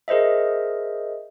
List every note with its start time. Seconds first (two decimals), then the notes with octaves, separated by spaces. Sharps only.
0.08 G#4 A#4 C5 D#5 E5